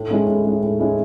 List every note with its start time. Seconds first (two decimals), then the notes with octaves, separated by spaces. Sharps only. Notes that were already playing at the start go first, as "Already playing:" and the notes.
Already playing: A2
0.11 G#3 C#4 E4
0.27 A2
0.45 G#3 C#4 E4
0.62 A2
0.80 G#3 C#4 E4